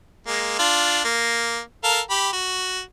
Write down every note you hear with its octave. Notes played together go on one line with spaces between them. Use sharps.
G#3 A#3
D4 F4
A#3
A4 A#4 F5
G4 B5
F#4